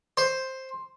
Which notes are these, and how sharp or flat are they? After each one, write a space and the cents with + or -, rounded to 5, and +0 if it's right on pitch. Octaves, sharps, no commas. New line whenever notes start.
C5 +5